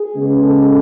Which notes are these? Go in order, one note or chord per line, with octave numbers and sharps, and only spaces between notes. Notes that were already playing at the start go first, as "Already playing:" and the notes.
Already playing: G#4
C#3 G#3 B3
A4